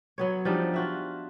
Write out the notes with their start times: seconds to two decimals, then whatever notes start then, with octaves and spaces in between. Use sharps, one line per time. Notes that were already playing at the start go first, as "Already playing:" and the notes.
0.18 F#3 B3 C#5
0.45 F3 G3 D4 D#4
0.74 F4 F#4 E5